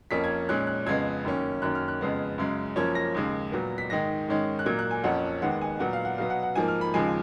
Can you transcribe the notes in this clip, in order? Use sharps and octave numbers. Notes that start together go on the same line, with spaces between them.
F2 F3 A#3 C#4 B6
G#6
A#2 G#3 C#4 F#6
F#6
F2 C#3 G#3 B3 G#6
F#2 D#3 A#3 C#4
F#2 D#3 A#3 C#4 F#6
F6
F#6
F2 C#3 G#3 B3
F#2 C#3 G#3
F#2 F3 A#3 C#4 G#6
A#6
D#2 C#3 G#3
A#2 F#3 B3
B6
G#2 D#3 G#3 A#6
G#2 D#3 G#3 C#4
F#6
A#2 F#3 A#3 G#6
F#6
G#5
F2 F3 A#3 C#4 F#5
D#2 D#3 G#3 B3 F#5
G#5
A#2 F#3 B3 F#5
F5
F#5
B2 F#3 B3 F5
F#5
F#5
G#2 F3 A#3 G#5
F6
B5
D#2 C#3 F3 G#3 G#5